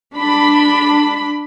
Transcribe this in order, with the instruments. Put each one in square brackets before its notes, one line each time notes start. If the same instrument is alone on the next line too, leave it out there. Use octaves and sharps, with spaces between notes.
[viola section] D4 B5